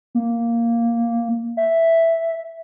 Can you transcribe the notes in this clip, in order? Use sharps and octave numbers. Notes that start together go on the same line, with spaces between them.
A#3
E5